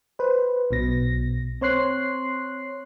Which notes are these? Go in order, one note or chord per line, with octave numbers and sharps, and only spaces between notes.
B4 C5
B1 B2 A#6
C4 C#5 C6 F#6 C7